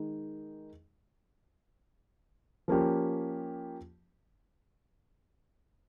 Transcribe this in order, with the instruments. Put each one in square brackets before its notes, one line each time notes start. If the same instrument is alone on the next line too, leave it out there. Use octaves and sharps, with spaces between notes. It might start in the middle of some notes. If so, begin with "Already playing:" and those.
Already playing: [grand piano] D#3 G#3 D#4
F3 A#3 C#4 G4